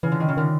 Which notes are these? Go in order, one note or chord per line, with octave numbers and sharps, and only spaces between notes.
C#3 E3
D3
D#3
C#3
D3 D#3